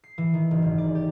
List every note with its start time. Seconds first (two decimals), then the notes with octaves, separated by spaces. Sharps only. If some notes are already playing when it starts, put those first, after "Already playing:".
0.04 C7
0.18 E3
0.34 D#3
0.51 F#1
0.62 G#1
0.78 D5
0.95 G4